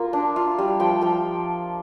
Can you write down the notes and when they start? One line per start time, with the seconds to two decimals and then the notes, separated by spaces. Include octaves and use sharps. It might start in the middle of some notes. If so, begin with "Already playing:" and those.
Already playing: A#3 F4
0.13 D4
0.36 F4
0.58 G3
0.80 F3 G5
1.01 F3 G5